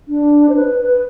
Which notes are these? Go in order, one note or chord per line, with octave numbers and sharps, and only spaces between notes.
D4
C5
B4
B4